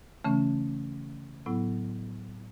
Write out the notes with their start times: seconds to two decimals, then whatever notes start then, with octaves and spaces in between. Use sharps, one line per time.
0.24 C#3 E3 A3 C#4
1.46 A2 F#3 B3 E4